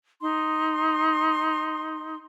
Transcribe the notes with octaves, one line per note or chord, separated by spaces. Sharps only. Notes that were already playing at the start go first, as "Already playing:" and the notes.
D#4 C6